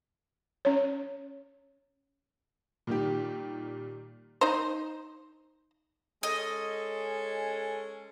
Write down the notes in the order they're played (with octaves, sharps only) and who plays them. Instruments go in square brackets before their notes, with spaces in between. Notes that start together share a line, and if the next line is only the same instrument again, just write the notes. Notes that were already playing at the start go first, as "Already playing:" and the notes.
[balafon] C#4 C#5
[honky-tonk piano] A#2 D#3 G3 G4
[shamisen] D#4 C5
[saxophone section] G#3 C#4 A4 [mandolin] D#5